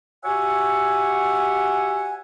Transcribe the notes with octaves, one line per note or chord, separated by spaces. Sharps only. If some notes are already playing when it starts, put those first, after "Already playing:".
F#4 G4 C#5 E5 F#5 G#5